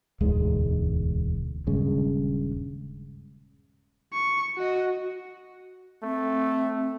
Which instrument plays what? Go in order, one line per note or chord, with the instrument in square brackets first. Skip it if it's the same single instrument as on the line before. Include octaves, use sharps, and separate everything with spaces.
[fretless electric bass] E1 D2 G#2 G#3
D#1 G2 C#3 G#3
[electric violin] C#6
F#4 D#5
[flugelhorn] A3 [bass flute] C4